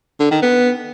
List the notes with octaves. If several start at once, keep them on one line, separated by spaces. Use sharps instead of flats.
D3
D#3
B3